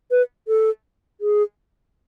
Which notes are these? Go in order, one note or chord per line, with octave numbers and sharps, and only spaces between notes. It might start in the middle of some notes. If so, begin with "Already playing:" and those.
B4
A4
G#4